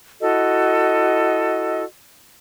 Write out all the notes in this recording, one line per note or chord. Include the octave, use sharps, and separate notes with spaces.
E4 F#4 A4 D#5